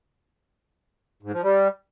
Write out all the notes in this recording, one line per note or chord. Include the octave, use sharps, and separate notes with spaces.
G#2
F3
G3